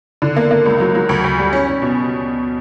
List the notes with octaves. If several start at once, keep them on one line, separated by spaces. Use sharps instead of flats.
D3
A#3
A#3
C#2
F#3
F#3
D2
D2
G3
C#4
C#4
B2